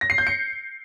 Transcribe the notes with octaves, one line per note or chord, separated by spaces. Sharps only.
A#6
C7
G6
C#7